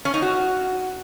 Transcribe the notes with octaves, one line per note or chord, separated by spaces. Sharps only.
C#4
D#4
F#4